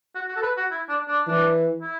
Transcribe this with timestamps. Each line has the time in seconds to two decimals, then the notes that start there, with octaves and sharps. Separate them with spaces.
0.15 F#4
0.29 F#4
0.36 A4
0.42 B4
0.57 F#4
0.71 E4
0.89 D4
1.08 D4
1.26 E3 D4
1.82 E4